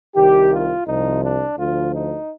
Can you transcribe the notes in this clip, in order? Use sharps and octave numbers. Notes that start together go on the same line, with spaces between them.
C2 C3 D#3 G4
F4
C2 C3 F3 D#4
D4
D2 D3 F3 F4
D#4